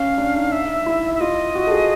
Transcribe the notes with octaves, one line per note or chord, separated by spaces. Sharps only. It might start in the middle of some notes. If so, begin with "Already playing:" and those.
Already playing: C#4 F5
D4
D#4
E5
E4
E5
F4 D#5
F#4
A4
G#4